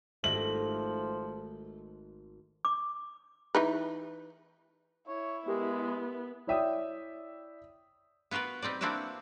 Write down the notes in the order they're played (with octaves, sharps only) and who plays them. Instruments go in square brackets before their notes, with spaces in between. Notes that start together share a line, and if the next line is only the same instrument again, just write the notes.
[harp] G#1 G4 A#6 [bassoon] F3 [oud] A3 [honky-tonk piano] F#7
[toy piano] D6
[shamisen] E3 D#4 B4
[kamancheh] E4 [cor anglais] C#5
[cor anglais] G#3 [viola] B3 [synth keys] G4 A#4
[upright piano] E4 C#5 D5 E5 G5 D#6
[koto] B3 F4 F#4 A#4 B4
G3 C4 D#4 D5
A#3 C4 D4 E4 F#4 B4